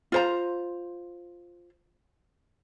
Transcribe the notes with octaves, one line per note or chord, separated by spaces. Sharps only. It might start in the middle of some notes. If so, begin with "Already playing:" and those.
F4 C5 A#5